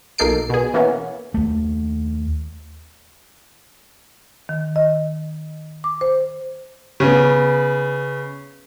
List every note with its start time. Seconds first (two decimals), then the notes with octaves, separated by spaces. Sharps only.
0.18 B1 A#3 D#4 A4 C7 D7
0.50 B2 G#4
0.74 E3 A#3 B3 C#4
1.34 D#2 A3
4.49 D#3
4.76 D#5
5.84 D6
6.01 C5
7.00 C#3 B3